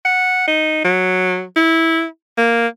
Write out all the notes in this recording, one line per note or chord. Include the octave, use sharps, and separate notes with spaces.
F#5
D#4
F#3
E4
A#3